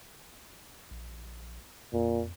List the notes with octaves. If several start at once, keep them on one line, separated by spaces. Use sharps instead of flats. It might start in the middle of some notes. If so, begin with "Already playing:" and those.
A#1
F2 A#2